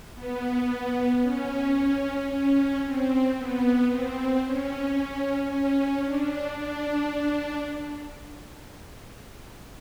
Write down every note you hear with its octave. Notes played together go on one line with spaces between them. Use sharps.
B3
C#4
C#4
C4
B3
C4
C#4
C#4
D4
D4